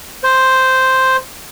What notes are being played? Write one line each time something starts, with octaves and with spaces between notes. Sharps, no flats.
C5